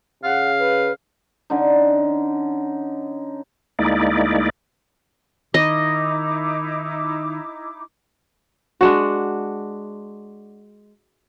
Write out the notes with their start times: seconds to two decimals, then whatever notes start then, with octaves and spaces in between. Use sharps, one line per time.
0.24 C#3 F5 F#5
0.58 B4
1.50 D3 C#4 D#4
3.79 D2 G#3 A#3 D#4 E4 D5
5.54 D#3 D#4 E4 D#5 D6
8.81 G#3 D4 F#4